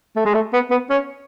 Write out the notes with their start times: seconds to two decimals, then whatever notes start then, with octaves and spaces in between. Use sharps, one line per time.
0.16 A3
0.25 G#3
0.34 A3
0.53 B3
0.71 B3
0.90 C#4